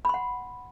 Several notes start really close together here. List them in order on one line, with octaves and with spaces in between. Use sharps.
B5 C6 F#5